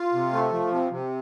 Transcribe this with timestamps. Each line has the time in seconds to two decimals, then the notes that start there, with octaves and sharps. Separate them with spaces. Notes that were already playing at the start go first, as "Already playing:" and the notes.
Already playing: F4
0.13 C3
0.32 A3
0.52 F3
0.71 C3
0.91 C3